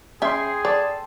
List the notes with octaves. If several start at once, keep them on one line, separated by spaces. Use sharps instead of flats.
C#4 G#4 E5 G5 C6
A4 C5 D5